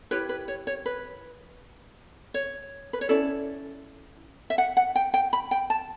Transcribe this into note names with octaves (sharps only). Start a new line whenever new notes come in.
E4 G4 B4 C#5
B4
C#5
C#5
B4
C#5
B4
C#5
C#4 E4 A4 D5
E5
F#5
F#5
G5
G5
B5
G5
A5